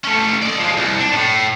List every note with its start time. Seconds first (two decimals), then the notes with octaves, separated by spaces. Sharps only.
0.04 A3 C#4
0.42 D5 D#5
0.58 F3 G#3
0.77 C2
0.99 D4
1.13 A2